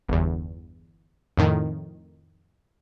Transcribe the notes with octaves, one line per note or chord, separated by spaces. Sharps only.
G1 E2
F2 A2 D#3